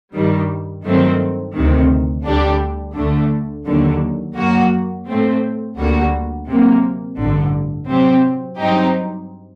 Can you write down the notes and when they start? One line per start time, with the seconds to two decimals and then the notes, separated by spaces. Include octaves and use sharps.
0.14 G2 D#3 G3
0.84 G2 D#3 F#3 A3 C4
1.55 D2 C3 D#3
2.25 D2 D3 G3 D4 G4
2.95 D2 D3 A3 D4
3.66 D#2 D3 F#3
4.37 F#2 F#3 A#3 F#4
5.07 A2 A3 C4
5.78 D2 D3 G3 A#3 F#4
6.48 C3 F#3 A#3
7.19 A1 G2 D3
7.89 C3 F#3 C4 G4
8.59 G2 F#3 C4 D#4 G4